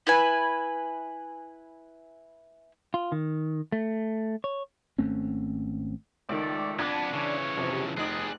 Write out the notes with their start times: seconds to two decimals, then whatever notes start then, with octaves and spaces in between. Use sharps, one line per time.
0.07 E4 B4 G#5
2.94 F4
3.12 D#3
3.72 A3
4.44 C#5
4.98 G#1 A3 C4 C#4
6.29 C#2 D#3 A3 D5
6.79 F2 B3 D4 G#6
7.13 C#3 E3 C#5
7.57 F2 C3
7.97 F1 D#4 G#4 D5 D#6 F#6